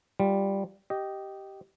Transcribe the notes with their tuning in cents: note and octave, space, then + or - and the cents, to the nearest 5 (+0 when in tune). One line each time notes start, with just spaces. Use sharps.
G3 +0 F4 +0
G4 -10 D#5 +0